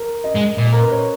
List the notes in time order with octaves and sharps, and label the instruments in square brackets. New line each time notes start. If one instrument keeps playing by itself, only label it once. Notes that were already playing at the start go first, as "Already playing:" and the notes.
Already playing: [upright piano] A#4
D#5
[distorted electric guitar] G#3
[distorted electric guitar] A#2 [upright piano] D#5
[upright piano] A#4
B4
C#5